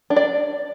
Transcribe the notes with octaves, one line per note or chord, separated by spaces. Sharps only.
D4
D5